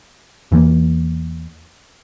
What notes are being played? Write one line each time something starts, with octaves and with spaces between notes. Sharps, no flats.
E2 E3 G#3 A#3